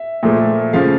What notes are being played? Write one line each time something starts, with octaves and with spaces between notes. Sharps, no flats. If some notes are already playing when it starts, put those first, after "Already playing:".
Already playing: E5
A#2 F3 A3
C#3 F3 A3 F5